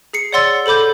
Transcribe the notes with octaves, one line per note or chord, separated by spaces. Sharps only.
G#4 C7 C#7
C#5 D5 F#5 C6 E6 A6
A4 C5 B5 D6 G6